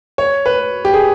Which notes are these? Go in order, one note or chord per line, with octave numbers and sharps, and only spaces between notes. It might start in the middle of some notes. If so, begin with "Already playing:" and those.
C#5
B4
G4
G#4